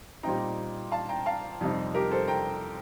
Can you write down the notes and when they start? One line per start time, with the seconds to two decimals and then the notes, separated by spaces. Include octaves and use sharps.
0.23 A#2 G3 C4 D#4 G5 A#5
0.91 F5 A5
1.09 G5 A#5
1.26 F5 A5
1.61 F2 C3 G3 C4 D#4
1.94 G4 A#4
2.11 A4 C5
2.28 G5 A#5